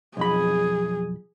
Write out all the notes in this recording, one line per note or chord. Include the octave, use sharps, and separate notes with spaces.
B1 F2 G#4 B5